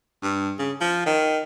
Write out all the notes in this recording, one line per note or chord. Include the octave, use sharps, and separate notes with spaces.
G2
C#3
F3
D#3